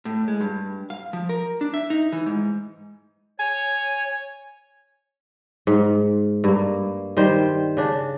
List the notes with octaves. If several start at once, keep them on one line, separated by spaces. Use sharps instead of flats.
A2
G#3
G2
F5
F3
A#4
D4
E5
D#4
E3
G#2
C#5 G#5
G#2
G2 A#3
D#3 G3 C5
C#3 D4